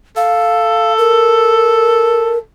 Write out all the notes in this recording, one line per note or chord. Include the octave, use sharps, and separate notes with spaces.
A4 F5
A#4